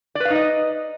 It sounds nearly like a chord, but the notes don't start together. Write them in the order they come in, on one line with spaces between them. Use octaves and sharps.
D5 B4 F5 D#4 D#5